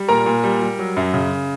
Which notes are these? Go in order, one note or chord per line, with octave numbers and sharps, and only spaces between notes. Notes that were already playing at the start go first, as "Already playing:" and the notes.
Already playing: G3
A#2 A#4 A#5
A#2
G3
G3
F#3
F#2
C#3